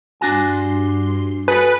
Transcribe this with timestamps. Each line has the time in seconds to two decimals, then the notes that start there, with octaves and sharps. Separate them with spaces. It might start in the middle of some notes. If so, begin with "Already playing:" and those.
0.21 G2 D4 F#4 G#5 C6
1.48 F#4 G#4 A4 B4